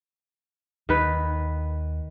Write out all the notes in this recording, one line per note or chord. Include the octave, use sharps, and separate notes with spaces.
D#2 D#3 B4